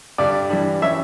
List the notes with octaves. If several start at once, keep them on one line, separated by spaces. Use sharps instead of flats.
G2 D3 G3 D4 D5
E3 G3 D4
E3 G3 C#4 E5